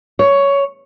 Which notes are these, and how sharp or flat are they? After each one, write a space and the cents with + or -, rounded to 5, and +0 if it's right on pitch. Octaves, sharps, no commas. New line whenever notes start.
C#5 +10